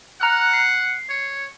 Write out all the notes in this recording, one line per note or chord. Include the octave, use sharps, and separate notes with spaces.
F#5 A#5 F6 F#6
C7
C#5